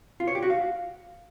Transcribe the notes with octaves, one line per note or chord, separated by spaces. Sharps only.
F4
C#5
G4
F#4
F5